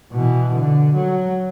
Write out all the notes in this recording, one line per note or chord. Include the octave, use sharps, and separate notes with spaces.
B2 E3
D3
F#3